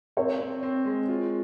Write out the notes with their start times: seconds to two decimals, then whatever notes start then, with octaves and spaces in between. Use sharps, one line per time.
0.17 C4 A#4 C#5
0.41 C4
0.63 C4
0.85 G#3
1.08 F4